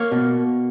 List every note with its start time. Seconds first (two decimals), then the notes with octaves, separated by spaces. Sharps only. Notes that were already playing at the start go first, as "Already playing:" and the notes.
Already playing: A#3 C#5 F5
0.12 B2